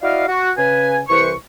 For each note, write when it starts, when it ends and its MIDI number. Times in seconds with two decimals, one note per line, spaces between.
0.02 0.27 64
0.02 0.27 66
0.02 0.27 74
0.02 0.27 75
0.02 0.27 77
0.27 0.51 66
0.57 0.99 49
0.57 0.99 71
0.57 0.99 80
1.09 1.33 36
1.09 1.33 52
1.09 1.33 71
1.09 1.33 72
1.09 1.33 85